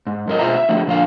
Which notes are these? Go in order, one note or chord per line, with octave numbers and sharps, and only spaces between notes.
G#2
F#2 A#4 D#5
B2 F4 G#4 C5 E5 A#5
E5
D3 F3 A3 F#4
A#2 D3 F3 D4 F5